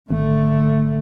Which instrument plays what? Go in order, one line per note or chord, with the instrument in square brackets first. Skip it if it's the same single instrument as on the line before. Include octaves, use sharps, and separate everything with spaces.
[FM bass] G#1 [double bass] D3 A3